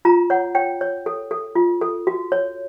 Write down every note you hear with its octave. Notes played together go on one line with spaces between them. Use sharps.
F4 A#5
C#5 F#5
C#5 G5
C#5
A4
A4
F4
A4
F#4
C#5